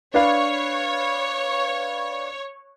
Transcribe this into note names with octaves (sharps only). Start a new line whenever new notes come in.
D4 B4 C#5 F5